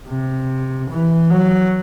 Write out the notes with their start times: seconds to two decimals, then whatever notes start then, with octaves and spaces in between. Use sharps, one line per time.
0.08 C3
0.90 E3
1.30 F#3